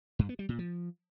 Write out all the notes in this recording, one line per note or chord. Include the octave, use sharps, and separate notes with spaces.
G2
B3
G3
A#2
F3